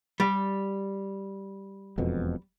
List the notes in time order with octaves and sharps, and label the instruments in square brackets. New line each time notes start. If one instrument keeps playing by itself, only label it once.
[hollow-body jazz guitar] G3
[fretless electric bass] E1 F2 B2